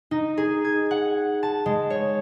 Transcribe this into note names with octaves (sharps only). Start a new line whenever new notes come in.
D#4
G#4
G#6
F#5
A5
G#3
C#5